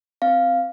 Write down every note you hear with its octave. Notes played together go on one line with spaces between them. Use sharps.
C4 F5